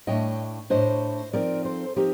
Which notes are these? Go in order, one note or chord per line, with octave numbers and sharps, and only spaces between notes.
A2 A3 D4 D#5 G5
A2 A3 D4 C5 D#5
F3 C4 D#4 A#4 D5
A4 C5
F3 C4 D#4 G4 A#4